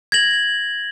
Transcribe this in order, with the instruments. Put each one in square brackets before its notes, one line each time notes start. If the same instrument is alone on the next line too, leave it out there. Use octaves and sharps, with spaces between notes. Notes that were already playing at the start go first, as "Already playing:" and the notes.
[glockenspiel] G#6 A#6 F#7